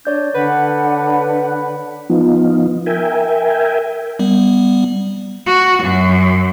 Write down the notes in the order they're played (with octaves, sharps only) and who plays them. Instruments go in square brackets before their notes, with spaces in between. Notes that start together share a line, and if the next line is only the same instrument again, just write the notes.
[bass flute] D4 [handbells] C#5 D5 G6
[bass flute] D3 [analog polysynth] B4 [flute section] F#5
[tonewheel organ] F3 B3 D#4 F4
A#4 E5 G5 G#5
[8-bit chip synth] G3 B3
[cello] F#4
F#2